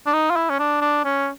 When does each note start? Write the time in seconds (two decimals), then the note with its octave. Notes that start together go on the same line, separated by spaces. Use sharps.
0.06 D4
0.13 D#4
0.30 F4
0.36 E4
0.50 C#4
0.59 D4
0.81 D4
1.05 C#4